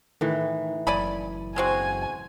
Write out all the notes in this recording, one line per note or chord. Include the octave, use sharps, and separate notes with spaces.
A2 D#3 E3
F#1 D5 G#5 B5
G#3 C4 F#4 G#5